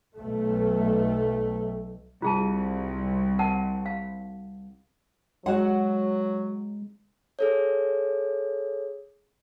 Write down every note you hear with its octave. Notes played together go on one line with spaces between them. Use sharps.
B1 A3
C2 F4 G#4 A5
A#4 F#5 A5
F5
F#3 G#3 F#4 F#5
G#4 A4 C#5